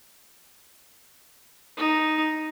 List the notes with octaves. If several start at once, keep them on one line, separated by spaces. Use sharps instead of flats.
D#4